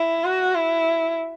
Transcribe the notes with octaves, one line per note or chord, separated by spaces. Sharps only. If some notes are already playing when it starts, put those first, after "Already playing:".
Already playing: E4
F#4
E4